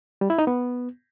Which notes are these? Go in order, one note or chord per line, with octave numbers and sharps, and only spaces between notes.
G3
E4
D#4
B3